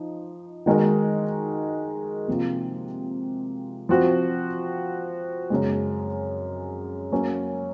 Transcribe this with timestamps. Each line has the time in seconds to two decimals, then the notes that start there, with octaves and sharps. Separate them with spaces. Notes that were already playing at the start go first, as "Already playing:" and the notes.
Already playing: F3 D#4
0.66 D#3 G#3 D#4 F#4 A#4
2.28 C3 F3 A#3 F4
3.89 F3 C4 F#4
5.50 F#2 C#3 G#3
7.12 F#3 A#3 C#4